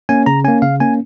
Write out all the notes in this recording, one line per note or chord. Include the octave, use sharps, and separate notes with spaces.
A#3 C#4 G#5
C#3 A#5
A#3 C#4 G#5
C#3 F5
A#3 C#4 G#5